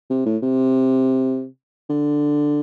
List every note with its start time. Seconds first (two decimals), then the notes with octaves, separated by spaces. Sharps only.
0.10 C3
0.25 A2
0.42 C3
1.90 D3